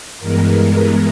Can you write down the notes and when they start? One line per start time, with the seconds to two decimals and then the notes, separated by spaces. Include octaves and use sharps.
0.19 G2 E3 G#3 B3 A#4
0.56 A#4